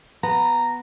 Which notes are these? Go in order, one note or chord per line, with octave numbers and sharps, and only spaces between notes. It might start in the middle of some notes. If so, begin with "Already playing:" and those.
B3 A#5